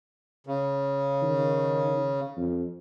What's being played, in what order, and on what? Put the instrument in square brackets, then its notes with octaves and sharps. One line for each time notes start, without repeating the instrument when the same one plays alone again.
[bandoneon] C#3
[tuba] D#3
F2